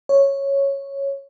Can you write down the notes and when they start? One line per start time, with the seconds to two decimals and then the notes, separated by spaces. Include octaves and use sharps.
0.09 C#5